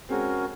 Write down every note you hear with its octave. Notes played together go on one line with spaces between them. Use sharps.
G#3 C4 C#4 F#4 A#4